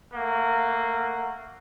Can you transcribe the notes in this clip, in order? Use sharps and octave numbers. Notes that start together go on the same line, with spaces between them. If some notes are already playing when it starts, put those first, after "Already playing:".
A3 A#3 F#5